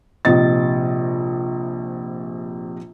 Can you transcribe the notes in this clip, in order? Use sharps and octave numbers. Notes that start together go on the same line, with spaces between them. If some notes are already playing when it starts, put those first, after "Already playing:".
A#1 C3 D#5 A6